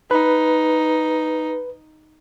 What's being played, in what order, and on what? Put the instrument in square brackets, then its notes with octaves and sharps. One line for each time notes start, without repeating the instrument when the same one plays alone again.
[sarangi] D#4 [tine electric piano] B4